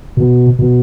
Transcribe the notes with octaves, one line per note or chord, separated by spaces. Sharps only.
B2
B2